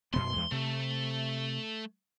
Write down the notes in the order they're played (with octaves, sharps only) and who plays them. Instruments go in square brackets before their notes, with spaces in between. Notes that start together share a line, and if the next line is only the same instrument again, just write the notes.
[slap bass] F#2 B2 B3 [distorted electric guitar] C6
[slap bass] E2 G#3
[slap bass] C3 [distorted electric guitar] A3